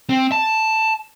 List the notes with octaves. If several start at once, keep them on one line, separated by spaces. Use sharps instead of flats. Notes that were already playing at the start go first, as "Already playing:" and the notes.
C4
A5